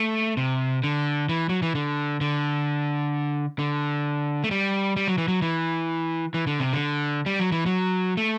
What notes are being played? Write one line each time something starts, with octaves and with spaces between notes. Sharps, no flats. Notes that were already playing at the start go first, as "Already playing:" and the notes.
Already playing: A3
C3
D3
E3
F#3
E3
D3
D3
D3
A3
G3
G3
F#3
E3
F#3
E3
E3
D3
C3
D3
G3
F#3
E3
F#3
A3